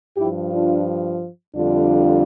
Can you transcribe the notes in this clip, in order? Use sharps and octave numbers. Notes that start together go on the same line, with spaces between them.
G2 F3 E4 G4
D4 F4
F2 D3 G3 D4 F4